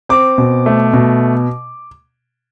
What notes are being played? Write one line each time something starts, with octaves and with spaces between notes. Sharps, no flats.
C4 D6
B2
A3
B2